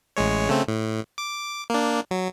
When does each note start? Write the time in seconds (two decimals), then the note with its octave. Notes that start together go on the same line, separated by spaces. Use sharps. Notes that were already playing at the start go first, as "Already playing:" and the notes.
0.17 A1 G#3 C#5
0.49 C#3 A3 C4
0.68 A2
1.18 D6
1.70 A#3 D4
2.11 F#3